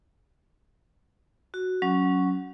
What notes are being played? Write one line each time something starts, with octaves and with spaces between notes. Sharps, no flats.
F#4
F#3 C#4